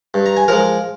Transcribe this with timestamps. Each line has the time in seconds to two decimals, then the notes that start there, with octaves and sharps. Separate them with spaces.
0.14 G2
0.26 A#5
0.37 G#5
0.48 F3 G#3 A#4 A#5